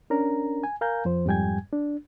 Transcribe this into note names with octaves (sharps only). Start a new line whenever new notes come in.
C#4 D4 A#4 A#5
G#5
A#4 F5 G#5 A#5 G6
F2 F3 C5
F2 G#2 G3 G5 G#5 G#6
D4